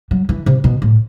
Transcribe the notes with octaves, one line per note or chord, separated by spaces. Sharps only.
F#3
E3
C3
B2
A2